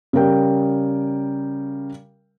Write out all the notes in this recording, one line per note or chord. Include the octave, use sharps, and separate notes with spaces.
C#3 G3 A#4 G5